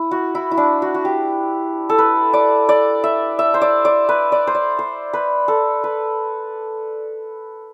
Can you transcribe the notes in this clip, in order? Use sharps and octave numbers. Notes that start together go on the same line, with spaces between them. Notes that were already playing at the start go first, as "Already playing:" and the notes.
Already playing: E4
F#4
E4
E4
D4
F#4
F#4
G4
A4
B4
D5
D5
E5
E5
C5
D5
D5
B4
D5
C5
D5
C5
B4
A4
B4